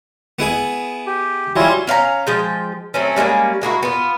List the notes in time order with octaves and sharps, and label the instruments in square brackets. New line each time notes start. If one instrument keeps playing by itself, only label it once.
[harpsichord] B3 E4 G#4
[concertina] G4
[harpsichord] F#3 G3 [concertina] E4 F4 G#5
[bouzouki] C#4 F5 G5 A#5
F3 G#3 G5
F#3 A3 C4 C#4
G3 G#3 A#3 C#4
G#3 A#3 E4 F#4
B3 F4